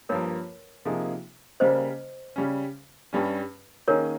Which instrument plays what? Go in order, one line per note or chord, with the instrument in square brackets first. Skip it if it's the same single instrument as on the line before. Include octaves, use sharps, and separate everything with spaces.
[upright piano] G2 F3 A#3 [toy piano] A#4 C#5
[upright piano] C3 F3 A#3 D#4 G#4
[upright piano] C#3 G3 A#3 [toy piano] C5 D#5
[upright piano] C#3 G3 C#4
G2 G3 C#4
[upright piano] D#3 A#3 C#4 G#4 D#5 [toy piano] A#4 C#5